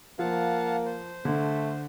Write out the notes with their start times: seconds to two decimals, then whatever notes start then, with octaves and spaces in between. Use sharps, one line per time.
0.19 F3 A#3 F5 F#5 A5
0.86 C5
1.25 D3 A3